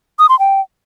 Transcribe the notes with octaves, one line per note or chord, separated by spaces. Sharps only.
D#6
C6
G5